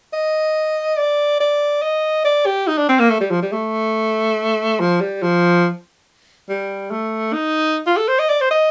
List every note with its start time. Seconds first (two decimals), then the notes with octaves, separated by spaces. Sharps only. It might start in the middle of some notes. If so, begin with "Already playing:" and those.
0.13 D#5
0.98 D5
1.40 D5
1.82 D#5
2.25 D5
2.46 G4
2.68 D#4
2.78 D4
2.89 C4
2.99 A#3
3.10 A3
3.21 G3
3.31 F3
3.42 G3
3.53 A3
4.80 F3
5.01 G3
5.23 F3
6.49 G3
6.91 A3
7.33 D#4
7.87 F4
7.97 A4
8.08 C5
8.19 D#5
8.29 D5
8.41 C5
8.51 D#5